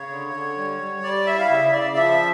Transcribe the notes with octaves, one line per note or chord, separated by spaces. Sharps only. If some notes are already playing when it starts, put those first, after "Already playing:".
Already playing: C#3 C#5
D3
D3
G3
G3
G3 D5
E4 E5
F5
C#3 E5
C#3 D5
F3 E5